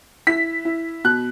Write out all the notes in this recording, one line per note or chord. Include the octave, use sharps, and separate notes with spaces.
E4 B6
E4
B2 F#6